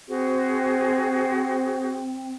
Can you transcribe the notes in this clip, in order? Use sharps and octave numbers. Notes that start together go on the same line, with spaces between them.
C4 F#4 G#4 C5